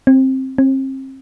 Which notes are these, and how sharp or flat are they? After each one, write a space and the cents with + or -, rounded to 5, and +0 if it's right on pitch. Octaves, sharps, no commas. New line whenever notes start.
C4 +15
C4 +35